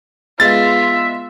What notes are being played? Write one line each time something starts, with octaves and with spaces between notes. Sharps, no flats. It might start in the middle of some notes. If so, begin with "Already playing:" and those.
G#3 B3 F4 E5 A6